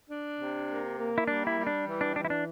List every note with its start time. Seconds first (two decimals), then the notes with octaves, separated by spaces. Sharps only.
0.09 D4
0.38 C3
0.68 A#3
0.97 A#3
1.18 E4
1.27 G3 D4
1.47 E4
1.57 G3
1.67 D4
1.86 E3
2.01 D4
2.16 E3 D4
2.25 E4
2.30 D4